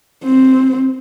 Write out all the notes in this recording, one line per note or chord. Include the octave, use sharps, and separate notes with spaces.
C4